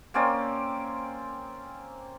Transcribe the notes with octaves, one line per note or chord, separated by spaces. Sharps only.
A#3 C4 C#4 D5